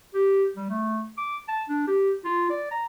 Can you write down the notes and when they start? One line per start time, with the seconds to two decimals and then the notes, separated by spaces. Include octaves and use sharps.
0.14 G4
0.56 G3
0.70 A3
1.18 D6
1.48 A5
1.69 D4
1.87 G4
2.25 F4
2.50 D5
2.71 A#5